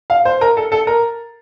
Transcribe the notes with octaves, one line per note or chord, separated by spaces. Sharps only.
F5
C5
A#4
A4
A4
A#4